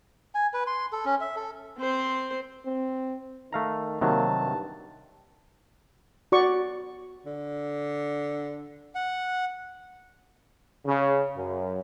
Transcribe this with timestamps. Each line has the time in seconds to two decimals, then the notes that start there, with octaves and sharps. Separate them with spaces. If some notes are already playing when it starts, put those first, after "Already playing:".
0.35 G#5
0.54 B4
0.67 C6
0.93 A4
1.05 C#4
1.21 E5
1.36 A4
1.78 C4 C5
2.66 C4
3.53 D#3 A3 F5 A#5
4.01 C3 D#3 F#3 A#3 A5
4.40 G2
6.32 F#4 D5 C#6
7.26 D3
8.95 F#5
10.86 C#3
11.36 F#2